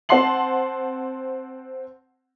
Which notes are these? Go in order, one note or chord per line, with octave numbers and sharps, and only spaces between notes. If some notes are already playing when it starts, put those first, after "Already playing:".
C4 F#5 A5 C6 C7 F#7